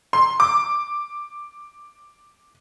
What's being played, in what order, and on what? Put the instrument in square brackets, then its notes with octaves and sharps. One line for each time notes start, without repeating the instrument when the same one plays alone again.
[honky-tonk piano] C6
D6